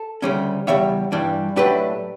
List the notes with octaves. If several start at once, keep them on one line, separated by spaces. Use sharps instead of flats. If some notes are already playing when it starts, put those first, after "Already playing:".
Already playing: A4
D2 C#3 G3 C#4
E2 C#3 G3 C#5 E5
G2 E3 G3 D4
A2 F#3 A3 D4 G4 B4